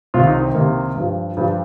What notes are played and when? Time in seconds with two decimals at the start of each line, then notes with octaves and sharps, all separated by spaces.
0.14 C2 C3 D#3 F4
0.27 D#4
0.41 C4
0.54 C2 C3 D#3 A#3
0.96 G2 F3
1.37 G2 F3 G3